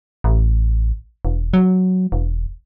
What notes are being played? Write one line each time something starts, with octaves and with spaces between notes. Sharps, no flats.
A1
E1
F#3
E1